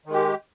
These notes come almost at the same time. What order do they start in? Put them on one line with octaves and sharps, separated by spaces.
D#3 G#3 G4